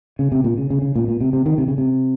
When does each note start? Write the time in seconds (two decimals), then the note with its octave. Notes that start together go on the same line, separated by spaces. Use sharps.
0.19 C#3
0.32 C3
0.44 A#2
0.58 C#3
0.70 C#3
0.82 C#3
0.96 A#2
1.08 A#2
1.21 C3
1.33 C3
1.46 D#3
1.58 C3
1.68 C#3
1.78 C3